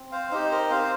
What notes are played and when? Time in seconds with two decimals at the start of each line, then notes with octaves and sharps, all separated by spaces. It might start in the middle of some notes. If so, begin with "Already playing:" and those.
Already playing: C4
0.12 C5 F5
0.31 D#4 G4 C5
0.51 A#4 D#5
0.70 C4 C5 F5